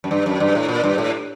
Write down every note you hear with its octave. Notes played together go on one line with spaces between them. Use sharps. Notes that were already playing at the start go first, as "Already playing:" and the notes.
F#2
G2
F#2
G2
A2
A#2
G2
A2